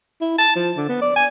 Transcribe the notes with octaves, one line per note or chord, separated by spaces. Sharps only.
E4
A5
F3
D3
B3
D5
G#5